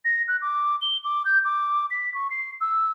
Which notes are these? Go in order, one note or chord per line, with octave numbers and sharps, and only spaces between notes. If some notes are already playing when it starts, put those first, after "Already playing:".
A#6
F#6
D6
G7
D6
G6
D6
B6
C#6
C7
E6